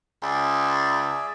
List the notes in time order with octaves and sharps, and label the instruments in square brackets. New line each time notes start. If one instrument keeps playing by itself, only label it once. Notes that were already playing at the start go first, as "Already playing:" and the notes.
[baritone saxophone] C#2 [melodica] G#4 D5 E5